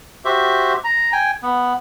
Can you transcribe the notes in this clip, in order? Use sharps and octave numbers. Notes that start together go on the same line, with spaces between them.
F#4 G4 C5 E5
A#5
G5 G#5
B3